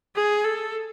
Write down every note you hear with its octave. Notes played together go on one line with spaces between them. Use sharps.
G#4
A4